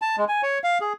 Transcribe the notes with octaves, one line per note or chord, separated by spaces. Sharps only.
A5
G#3
G#5
C#5
F5
G#4